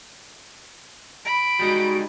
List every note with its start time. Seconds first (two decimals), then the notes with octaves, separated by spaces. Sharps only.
1.25 B5 D7
1.59 G3 G#3 D#4 F#4